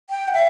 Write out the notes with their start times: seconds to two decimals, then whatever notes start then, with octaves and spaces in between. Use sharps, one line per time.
0.10 G5
0.28 F#5
0.33 E5